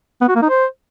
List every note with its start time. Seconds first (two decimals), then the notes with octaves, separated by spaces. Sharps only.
0.21 B3
0.28 F#4
0.35 A#3
0.42 D#4
0.49 C5